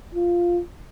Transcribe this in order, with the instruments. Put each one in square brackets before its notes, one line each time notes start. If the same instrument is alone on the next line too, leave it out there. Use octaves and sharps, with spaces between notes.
[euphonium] F4